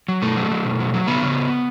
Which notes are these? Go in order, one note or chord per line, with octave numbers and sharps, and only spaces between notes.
F#3
B2 A3
F#3
F#3
B2
F#3
F#3
C#3 B3
C#3